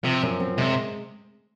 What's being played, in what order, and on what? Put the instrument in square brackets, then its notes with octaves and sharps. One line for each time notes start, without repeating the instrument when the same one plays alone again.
[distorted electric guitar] C3 [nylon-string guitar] F3
[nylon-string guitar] F#2
C4
[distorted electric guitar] C3 [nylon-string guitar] G#3